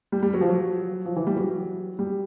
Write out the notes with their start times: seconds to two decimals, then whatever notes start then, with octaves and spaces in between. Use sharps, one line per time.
0.12 G3
0.23 G3
0.34 F#3
0.41 F3
0.49 F#3
1.05 F3
1.16 E3
1.27 G3
1.36 F#3
1.99 G3